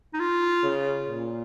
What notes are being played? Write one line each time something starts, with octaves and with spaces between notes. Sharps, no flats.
D#4
F4
C#3
A#2